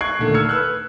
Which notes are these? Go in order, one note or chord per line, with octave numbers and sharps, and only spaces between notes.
C#6 F#6 G#6 C7 D7
A#2 D3 D#3 A3
E6 F6 G#6 C#7
B4 E6 F#6